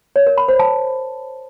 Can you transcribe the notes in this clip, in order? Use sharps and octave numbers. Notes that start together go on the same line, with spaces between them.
C#5
A#4
B5
C5
A5